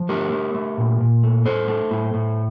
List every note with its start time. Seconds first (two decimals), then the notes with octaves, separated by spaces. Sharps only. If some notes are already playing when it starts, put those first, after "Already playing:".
Already playing: F3
0.09 A3 G4 A#4
0.32 A3
0.54 A3
0.77 A#2
1.01 A#2
1.23 A3
1.45 A2 A4 C5
1.68 A3
1.91 A2
2.14 A2